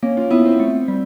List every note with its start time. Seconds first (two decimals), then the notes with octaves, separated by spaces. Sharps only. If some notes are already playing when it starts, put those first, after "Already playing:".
0.03 A#3 C#4
0.17 F4
0.30 B3 E4
0.45 C4
0.60 A3
0.88 G3